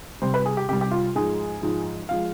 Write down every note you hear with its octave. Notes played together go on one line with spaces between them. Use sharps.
C3 G3 C5
B4
G#4
G4
C3 G3 G4
G4
F4
G#2 F3 G#3 G#4
G#2 F3 G#3
F3 G#3 F5